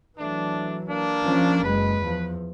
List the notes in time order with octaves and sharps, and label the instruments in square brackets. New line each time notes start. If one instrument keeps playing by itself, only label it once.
[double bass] E3 F#3 [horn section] A3 D4
[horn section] A#3 D4
[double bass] F3 C#4
[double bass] F#1 G#3 [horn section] B4
[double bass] E2 F3